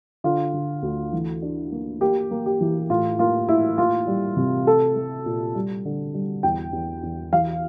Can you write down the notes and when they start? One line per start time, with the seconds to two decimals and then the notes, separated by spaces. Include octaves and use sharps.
0.24 D3 F4
0.53 D3
0.83 D2
1.13 E3
1.42 D4
1.72 A#3
2.01 A#3 G4
2.31 A#3
2.46 G4
2.61 E3
2.90 A2 F4
3.19 A#3 F4
3.49 A2 E4
3.78 A#3 F4
4.07 G3
4.37 C3
4.66 A3 A4
4.96 A3
5.26 A#2
5.55 G3
5.85 D3
6.14 G3
6.43 E2 G5
6.73 E2
7.03 E2
7.32 E3 F5